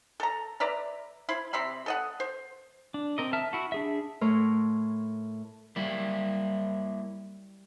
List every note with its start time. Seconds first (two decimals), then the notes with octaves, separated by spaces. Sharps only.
0.20 A4 A#5
0.60 B4 D5 E5 A#5
1.29 E4 C5 B5
1.53 C3 E5 B5 C6
1.86 A4 D#5 F#5
2.20 C5
2.94 D4
3.18 C4 A#4 D#5
3.33 E5 A5 F6
3.53 E4 F#4
3.72 D4 G#4 E5
4.21 A2 A3 A#4 C#5 C6
5.76 G3 A#3 E4